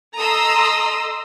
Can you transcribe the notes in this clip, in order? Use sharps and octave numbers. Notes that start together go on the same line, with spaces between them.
A4 D#5 A#5 C6 D#6 E6